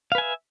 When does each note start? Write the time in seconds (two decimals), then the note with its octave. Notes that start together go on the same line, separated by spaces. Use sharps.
0.12 F5
0.15 B4
0.18 G#5
0.21 E5